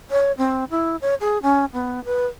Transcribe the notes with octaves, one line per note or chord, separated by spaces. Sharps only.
C#5
C4
E4
C#5
G#4
C#4
B3
B4